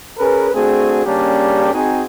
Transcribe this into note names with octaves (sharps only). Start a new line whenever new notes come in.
C#4 G#4 A#4 B4
A3 C4 D4 F#4 G#4
C#3 G3 A#3 C#4 D4 G4
C4 D#4 F#4 G#4